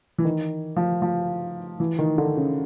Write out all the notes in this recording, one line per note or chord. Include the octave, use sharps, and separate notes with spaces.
E3
D#3
F3
F3
E3
D#3
D3
C#3